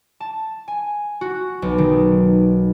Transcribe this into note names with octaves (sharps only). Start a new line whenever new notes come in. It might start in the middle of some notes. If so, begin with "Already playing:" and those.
A5
G#5
F#4
B1
D#3